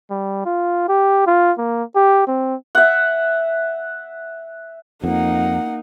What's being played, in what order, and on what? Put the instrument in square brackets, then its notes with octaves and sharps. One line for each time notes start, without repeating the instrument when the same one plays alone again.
[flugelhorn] G3
F4
G4
F4
A#3
G4
C4
[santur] E5 F#5
[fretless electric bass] F2 [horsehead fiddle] A#3 D#4 [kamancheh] F#5